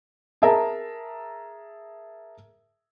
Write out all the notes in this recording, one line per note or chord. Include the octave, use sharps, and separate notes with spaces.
G#4 A#4 E5 A5 A#5